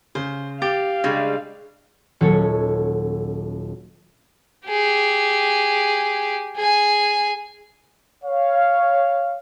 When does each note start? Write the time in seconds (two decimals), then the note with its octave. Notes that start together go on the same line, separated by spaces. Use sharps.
0.15 C#3 C5
0.62 G4 F5 A6
1.04 C#3 G3 G#3 D4
2.21 D#1 F#3 C#4 A4 C#5
4.67 G4 G#4
6.56 G#4 G#5
8.24 C#5 F5